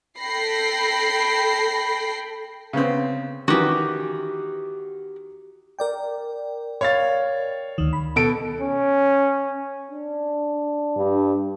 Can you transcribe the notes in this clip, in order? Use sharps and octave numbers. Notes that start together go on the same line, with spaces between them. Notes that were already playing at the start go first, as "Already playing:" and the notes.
A4 G5 B5 A#6 C7
C#3 B3 C4
D#3 E3 F#4 G4
A#4 D5 G5
C#5 F5 A6
D2 D#3
B5
B2 A4 D7
C#4
D4
G2